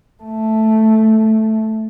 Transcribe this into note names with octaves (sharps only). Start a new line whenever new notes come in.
A3